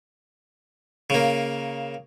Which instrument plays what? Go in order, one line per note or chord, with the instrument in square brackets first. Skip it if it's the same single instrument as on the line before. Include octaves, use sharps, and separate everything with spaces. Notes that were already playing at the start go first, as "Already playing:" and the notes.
[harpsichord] C#3 A#3